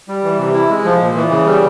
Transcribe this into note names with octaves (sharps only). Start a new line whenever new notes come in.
G3
E3
C3
E4
G#3
F3
A#2
E3
C#3
G3